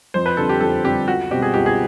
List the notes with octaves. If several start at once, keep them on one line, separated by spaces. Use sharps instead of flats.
F2 C5
B4
D3 G3 C4 A4
G4
F2 A4
D3 G3 C4 G4
C#2 F#4
B2 G3 C4 G4
G#4
C#2 G4
G#4